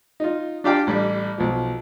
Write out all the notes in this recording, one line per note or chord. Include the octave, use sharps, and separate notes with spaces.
D#4 F4
D4 F4 G4 D5 F5 G5
A1 G3
B1 F3